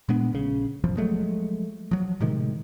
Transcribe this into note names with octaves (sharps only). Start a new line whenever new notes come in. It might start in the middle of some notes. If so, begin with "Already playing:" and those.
A#2 G#3 B3 D4
A#1 C#3
E1 A1 F#2 F3
F3 F#3 G#3 A3
F3 F#3
A2 C3 D#3 G#3